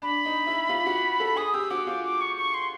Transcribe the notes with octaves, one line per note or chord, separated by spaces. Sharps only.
D4 B5
D#4
E4
F4
F#4
A4
G#4 D#6
G4 E6
F#4 D6
F4 D6
D6
C#6
C#6
C6